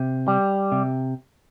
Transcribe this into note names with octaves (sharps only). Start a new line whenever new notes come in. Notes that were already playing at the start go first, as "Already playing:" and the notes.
Already playing: C3
G3
C3